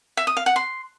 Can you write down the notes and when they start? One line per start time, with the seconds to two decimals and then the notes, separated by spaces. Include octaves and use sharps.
0.17 E5
0.27 D#6
0.37 F5
0.46 F#5
0.56 C6